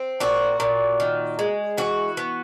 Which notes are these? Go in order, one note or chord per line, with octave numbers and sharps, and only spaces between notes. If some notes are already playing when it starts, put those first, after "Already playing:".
Already playing: C4
A#2 F#4
A#2
D#3
G#3
E3 F#4
B3